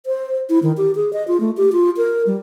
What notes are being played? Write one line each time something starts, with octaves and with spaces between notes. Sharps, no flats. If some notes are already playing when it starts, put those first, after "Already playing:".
C5
E4
D#3
G4
G#4
D#5
F4
A3
G4
F4
A#4
G3